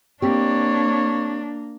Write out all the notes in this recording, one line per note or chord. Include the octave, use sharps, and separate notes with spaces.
A#3 C4 D4 G4 C#5